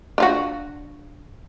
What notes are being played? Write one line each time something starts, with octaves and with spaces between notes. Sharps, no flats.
D4 F4 F#4